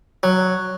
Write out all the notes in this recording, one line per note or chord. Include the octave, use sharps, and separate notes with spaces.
F#3